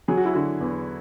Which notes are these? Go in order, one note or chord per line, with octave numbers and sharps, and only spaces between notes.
F#3 G#4
F#4
E4
D3 F#4
E2